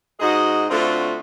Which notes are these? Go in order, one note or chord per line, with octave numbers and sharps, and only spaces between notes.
G#2 F#4 G#4 D#5
D3 A3 C4 F4 F#4